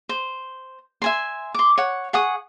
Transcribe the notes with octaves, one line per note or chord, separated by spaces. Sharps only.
C5
E5 G#5 C6
C6 D6
C#5 F#5
G#4 F#5 C#6 D#6